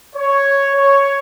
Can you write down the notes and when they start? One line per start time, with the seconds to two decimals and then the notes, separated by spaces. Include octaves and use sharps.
0.16 C#5
0.76 C#5